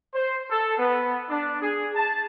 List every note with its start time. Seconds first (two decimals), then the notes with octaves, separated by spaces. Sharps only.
0.13 C5
0.50 A4
0.78 B3
1.29 D4
1.62 G#4
1.95 A5